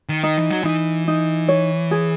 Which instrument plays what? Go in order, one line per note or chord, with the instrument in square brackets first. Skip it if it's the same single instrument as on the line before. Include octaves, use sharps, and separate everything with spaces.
[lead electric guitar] D#3
[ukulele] D#4
[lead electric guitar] E3
F#3
[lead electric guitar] E3 [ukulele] D#4
[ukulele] D#4
C#5
G#4